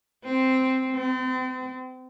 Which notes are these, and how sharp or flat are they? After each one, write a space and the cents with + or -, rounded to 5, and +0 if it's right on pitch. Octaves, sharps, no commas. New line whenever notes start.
C4 -5
C4 -40